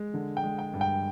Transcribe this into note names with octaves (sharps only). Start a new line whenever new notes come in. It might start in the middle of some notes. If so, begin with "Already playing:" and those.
Already playing: G#3
D3
G5
G#3
G5
G2
G5